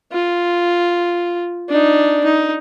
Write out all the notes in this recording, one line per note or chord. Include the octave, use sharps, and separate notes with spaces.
F4
D4 D#4
D#4